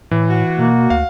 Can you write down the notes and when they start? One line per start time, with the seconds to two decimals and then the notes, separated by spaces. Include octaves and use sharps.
0.11 A2 E3
0.29 F#4
0.59 B2 A#3
0.90 D2 F5